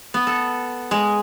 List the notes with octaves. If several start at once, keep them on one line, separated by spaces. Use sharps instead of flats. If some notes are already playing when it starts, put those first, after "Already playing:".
B3
A4
G#3